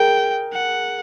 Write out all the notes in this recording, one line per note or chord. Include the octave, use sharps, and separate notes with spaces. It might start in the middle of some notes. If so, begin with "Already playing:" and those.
Already playing: G#4 A#4 G5
F#5